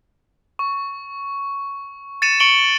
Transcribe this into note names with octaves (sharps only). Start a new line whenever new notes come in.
C#6
A6 C#7 D#7 E7
C#6 C#7 D7 F#7 G7